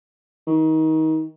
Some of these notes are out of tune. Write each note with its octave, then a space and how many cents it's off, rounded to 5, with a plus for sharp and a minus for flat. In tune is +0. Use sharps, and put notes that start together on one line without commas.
D#3 +30